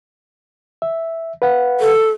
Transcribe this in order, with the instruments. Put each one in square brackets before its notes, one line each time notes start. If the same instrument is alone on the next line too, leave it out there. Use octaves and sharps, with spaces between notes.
[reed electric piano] E5
B4 F5 F#5
[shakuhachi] A4